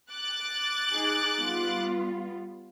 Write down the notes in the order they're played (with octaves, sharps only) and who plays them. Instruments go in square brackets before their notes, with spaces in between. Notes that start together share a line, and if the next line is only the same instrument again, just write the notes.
[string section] D6 F#6 A6
[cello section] D#4 G#4
G3 B3 F4